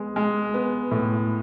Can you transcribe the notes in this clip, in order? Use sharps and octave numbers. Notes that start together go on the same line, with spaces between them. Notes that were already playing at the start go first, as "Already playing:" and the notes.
Already playing: G#3 B3
G#3
B3
A2